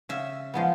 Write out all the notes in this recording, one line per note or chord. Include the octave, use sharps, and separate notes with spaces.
C#3 E5
F3 G#3 B3